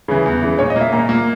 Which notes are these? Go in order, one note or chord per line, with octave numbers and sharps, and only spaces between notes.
C#3 E3
E2
C#3 E3
A#2 C#5
D#5
A#3 E5
A#2 A#5
A#3